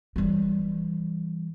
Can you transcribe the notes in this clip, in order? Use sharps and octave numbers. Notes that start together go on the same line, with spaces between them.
E3 G3